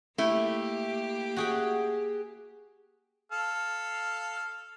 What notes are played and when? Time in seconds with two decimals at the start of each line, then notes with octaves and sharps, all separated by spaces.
0.18 A3 A#3 E4 G4
1.36 F#4 G#4 G5
3.32 A4 F5